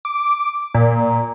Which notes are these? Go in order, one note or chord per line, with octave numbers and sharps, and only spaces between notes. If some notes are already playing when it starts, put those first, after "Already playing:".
D6
A#2